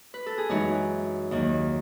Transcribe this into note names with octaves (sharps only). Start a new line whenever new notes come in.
B4
A4
G#4
F#2 E3 G#3 D#4 F#4
D#2 D#3 F#3